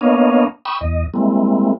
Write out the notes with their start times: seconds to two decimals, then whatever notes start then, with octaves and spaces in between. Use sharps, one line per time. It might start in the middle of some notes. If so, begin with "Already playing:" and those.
0.01 A#3 B3 D4 C#5 D#5 F5
0.65 G5 B5 C#6 D#6 E6
0.81 E2 D#5
1.14 G3 G#3 A#3 C4 E4